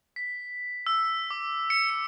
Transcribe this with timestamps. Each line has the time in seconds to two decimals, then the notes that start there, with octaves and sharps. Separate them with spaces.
0.16 B6
0.86 E6
1.30 D6
1.70 C#7
1.90 C#7